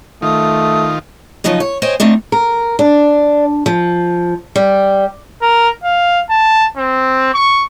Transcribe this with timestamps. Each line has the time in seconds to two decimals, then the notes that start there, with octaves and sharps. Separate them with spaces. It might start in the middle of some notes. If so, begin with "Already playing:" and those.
0.22 D#3 A3 F4 D#6
1.44 C#3 F3 F#3 D#4 D#5
1.60 C#5
1.82 C5 C#5 D#5 G5 G#5
2.00 A3 C4 D4 D#4
2.32 A#4
2.79 D4
3.66 F3
4.56 G3
5.42 A#4
5.83 F5
6.29 A5
6.77 C4
7.34 C#6